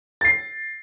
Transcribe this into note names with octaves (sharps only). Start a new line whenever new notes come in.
A6 C7